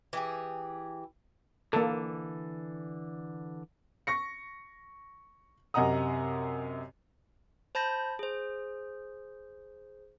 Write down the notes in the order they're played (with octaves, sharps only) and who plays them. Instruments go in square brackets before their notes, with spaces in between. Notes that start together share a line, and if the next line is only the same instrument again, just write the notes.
[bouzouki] E3 G4 G#4
[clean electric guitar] D3 E3 [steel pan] A#3 A4
[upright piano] C#6 A#6 C#7
F#2 C3 D#5 F#5 A#5 D#6
[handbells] C5 A5 B5 G6 A#6
G#4 C5